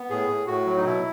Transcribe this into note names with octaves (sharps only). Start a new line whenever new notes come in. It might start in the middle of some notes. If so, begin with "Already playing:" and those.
Already playing: B3
A2 G#4
A2
A2 F#4
F#3
D#4
B2 E4